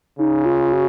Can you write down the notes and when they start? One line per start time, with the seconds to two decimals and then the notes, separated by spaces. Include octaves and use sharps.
0.18 C#3 D#4
0.45 F4
0.73 F#4